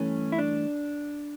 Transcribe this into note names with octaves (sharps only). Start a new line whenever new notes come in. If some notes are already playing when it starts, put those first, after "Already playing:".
Already playing: G2 E3 A3 C#4
E4
D4